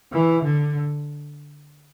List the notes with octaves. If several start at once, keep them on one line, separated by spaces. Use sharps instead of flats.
E3
D3